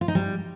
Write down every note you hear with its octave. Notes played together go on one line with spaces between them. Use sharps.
F4
D#4
G3